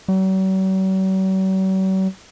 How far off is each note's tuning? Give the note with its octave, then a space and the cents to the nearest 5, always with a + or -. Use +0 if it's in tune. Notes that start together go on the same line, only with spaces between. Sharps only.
F#3 +45